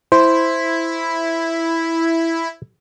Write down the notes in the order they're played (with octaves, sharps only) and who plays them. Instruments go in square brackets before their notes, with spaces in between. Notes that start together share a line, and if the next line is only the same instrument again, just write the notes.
[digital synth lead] E4 [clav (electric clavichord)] C5